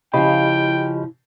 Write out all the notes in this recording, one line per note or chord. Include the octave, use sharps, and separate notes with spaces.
C#3 F3 E4 G4 D#5 G5 B5